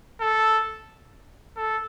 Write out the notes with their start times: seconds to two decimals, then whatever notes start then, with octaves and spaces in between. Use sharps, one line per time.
0.21 A4
1.57 A4